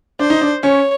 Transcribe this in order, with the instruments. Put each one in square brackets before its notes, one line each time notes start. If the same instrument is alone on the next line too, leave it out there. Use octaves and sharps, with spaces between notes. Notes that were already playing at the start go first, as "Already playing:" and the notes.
[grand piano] D4 [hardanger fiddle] C5
[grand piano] D#4
D4
[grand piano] C#4 [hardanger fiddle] C#5